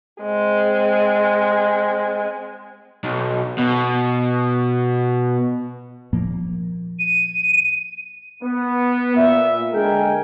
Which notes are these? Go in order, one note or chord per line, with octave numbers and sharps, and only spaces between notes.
G#3 C4
B1
B2
A#2 F3 A#3
D#7
B3
A#2 E5
D3 G#3 G#4 A#4 G5 G#5